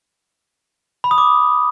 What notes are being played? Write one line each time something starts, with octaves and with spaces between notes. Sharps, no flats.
B5
D#6
D6